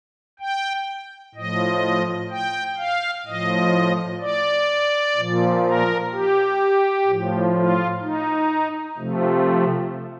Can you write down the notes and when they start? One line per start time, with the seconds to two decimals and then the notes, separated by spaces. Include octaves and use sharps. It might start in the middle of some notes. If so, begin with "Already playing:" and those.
0.40 G5
1.35 A2 F3 D#5
2.31 G5
2.78 F5
3.25 A2 F3 D#5
4.21 D5
5.16 A#2 F3
5.64 A#4
6.11 G4
7.07 A2 F3
7.54 F4
8.02 D#4
8.98 C3 F3 A3